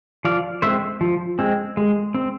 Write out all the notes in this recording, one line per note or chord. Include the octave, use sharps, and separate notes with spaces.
F3 D5 F5
G#3 C4 C5 E5
F3
G#3 C4
G#3
C4